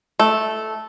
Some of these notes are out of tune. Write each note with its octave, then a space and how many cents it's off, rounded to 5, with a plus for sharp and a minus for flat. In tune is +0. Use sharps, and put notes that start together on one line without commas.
A3 -10